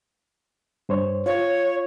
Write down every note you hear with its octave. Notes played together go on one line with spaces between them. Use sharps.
G2 C5 C#5
F4 C#5